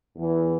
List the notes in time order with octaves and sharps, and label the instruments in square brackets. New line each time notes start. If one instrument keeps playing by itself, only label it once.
[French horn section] E2 E3